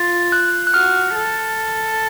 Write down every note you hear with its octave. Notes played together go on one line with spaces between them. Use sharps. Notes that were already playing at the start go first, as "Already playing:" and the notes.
Already playing: F4 A6
F#6
F#6
F#4 F6
A4